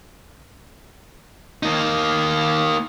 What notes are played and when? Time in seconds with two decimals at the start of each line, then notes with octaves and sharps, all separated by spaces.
1.63 A#3 D#4